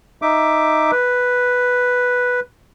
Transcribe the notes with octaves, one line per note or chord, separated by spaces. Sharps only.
D#4 E5 D6
B4